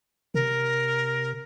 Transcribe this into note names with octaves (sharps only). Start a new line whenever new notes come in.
C3 A#4